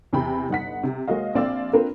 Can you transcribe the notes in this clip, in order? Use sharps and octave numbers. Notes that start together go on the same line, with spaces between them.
E2 C3 G5 B5
G1 D#4 F#5 B6
C3
G#3 A#3 F#4 C#5 D#5 F5
A#1 C4 D5 F5 E6
C4 D4 F4 A#4 B4